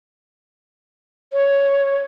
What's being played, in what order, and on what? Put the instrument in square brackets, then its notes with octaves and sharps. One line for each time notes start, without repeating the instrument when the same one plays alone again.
[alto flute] C#5